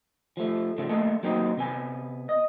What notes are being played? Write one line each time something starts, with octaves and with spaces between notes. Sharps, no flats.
F3 A3
G#2 C#3 F3 A3
A3 A#3 D4 A4 D#5
F#3 A#3 C4 D#4
C3 B3 G#5
D#5